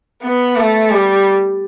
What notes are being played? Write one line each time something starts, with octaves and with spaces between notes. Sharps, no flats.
B3
A3
G3